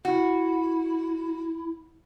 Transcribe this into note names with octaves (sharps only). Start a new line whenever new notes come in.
E4 F#4